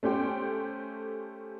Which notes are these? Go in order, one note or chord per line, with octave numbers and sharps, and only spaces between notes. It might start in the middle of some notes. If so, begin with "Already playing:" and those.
A3 C#4 G4 C5 G5